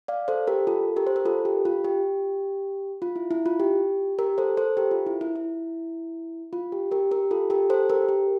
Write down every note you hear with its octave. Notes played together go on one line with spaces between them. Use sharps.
D5 F5
A4 C5
G4 A#4
F4 A4
G4 A#4
C5
A#4
F4 A4
G4
F4
G4
F4
E4
E4
F4
G4
G4 A#4
A4 C5
A4 C5
G4 A#4
F4
E4
E4
E4
F4
G4
G4 A#4
G4 A#4
F4 A4
G4 A#4
A4 C5
G4 A#4
G4